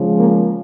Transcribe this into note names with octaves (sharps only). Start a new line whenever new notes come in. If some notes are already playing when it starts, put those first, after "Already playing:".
Already playing: C#3 F3 G#3
A#3